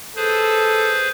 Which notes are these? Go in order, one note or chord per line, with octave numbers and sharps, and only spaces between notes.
G#4 A4 B4 C5